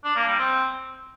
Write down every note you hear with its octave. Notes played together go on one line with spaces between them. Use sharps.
D4
A#3
G3
C4